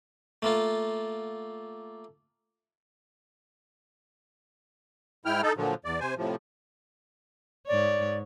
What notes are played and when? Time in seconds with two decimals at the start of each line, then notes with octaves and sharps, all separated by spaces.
0.42 A3 A#3 F4
5.25 G#2 E4 G5 F6
5.42 D#4 A4
5.57 A#2 D3 F3 F#3
5.85 E2 D5
6.00 C3 C5 G#5
6.17 A2 C3 F3
7.67 G#2 C#5 D5